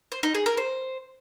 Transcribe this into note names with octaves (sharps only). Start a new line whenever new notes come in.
C5
D#4
G#4
A#4
C5